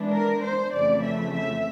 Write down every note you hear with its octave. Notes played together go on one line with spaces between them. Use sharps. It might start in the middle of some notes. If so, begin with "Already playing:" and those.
Already playing: E3 G#3 B3 D4
A#4
C5
F2 C#3 E3 A3 D5
E5
E5